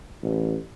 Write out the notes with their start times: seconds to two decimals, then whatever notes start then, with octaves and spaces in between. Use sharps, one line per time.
0.23 A1